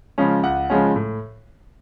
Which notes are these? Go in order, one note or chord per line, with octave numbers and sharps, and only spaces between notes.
C#3 F3 G#3 C#4
C#2 F#5
C#3 F3 G#3 C#4
A2